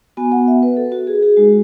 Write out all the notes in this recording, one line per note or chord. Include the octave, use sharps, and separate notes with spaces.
B3 F#4 G#5
F#5
E5
B4
A4
F#4
G#4
G#4
G#3 D#4 F#4